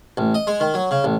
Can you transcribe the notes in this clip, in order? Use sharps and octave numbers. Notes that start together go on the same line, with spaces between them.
A1
D#5
G#3
D#3
F#3
C#3
A1